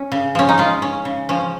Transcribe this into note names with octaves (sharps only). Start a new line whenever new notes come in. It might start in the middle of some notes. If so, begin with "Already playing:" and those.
Already playing: C#4
C#3
F3 C#4
D#4
G#3 F4
C#4
C#3
F3 C#4